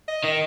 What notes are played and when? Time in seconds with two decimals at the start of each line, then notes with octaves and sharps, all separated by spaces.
0.08 D#5
0.24 D#3 D#5